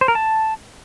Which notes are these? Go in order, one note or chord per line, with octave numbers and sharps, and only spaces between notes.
C5
A#4
A5